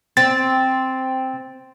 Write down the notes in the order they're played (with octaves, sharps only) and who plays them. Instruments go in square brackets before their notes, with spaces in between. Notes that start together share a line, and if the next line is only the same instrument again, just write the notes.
[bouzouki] C4 [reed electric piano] A6